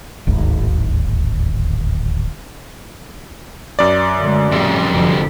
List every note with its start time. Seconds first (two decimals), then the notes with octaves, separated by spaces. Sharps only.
0.27 D1 G#1 D#2
3.79 F#2 D5
4.19 D3 G#3 A3
4.52 F2 A2 C#3 G3
4.90 F1 D3 F3